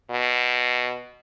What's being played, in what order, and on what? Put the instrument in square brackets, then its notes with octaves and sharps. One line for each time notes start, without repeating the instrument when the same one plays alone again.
[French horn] B2